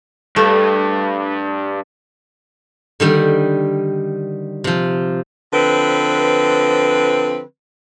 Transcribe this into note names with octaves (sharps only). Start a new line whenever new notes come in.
G2 A3
D3 D#3 G3
C3 F3
D3 F3 C4 B4